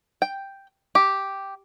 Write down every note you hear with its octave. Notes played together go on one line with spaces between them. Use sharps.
G5
G4